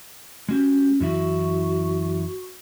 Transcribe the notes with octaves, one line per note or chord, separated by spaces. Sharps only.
G#3 C#4 F#4 G4
F#2 E3 E4 F#4